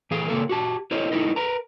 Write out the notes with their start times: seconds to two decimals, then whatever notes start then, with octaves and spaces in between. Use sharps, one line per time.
0.11 E3 A3 G#4 F5
0.28 C#3 A#3 A4 A#4
0.49 F#4 G4 A5
0.91 E4 A4 A#4 C5 C#5 D#5
1.12 A3 D#4 E4 A#4 D#5
1.36 A#4 B4 A#5